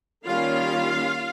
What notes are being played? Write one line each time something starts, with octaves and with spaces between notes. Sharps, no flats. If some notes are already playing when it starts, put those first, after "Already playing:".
D#3 G3 A#3 C#4 F4 F5